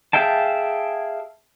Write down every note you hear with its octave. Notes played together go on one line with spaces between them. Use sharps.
G#4 E5 F5 G5 A5